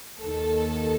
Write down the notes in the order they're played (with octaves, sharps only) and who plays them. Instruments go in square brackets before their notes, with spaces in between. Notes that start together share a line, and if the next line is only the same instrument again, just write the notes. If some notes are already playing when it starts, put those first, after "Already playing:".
[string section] D#2 D#3 A4